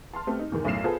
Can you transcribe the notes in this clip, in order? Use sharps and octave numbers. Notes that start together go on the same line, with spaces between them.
A5 C6 F6
A3 B3 C4 G4
D#4
E2 G#2 D#3
B1 F#2 A2 F6 C7 E7
B3 F4 G#4 A4 B4 C5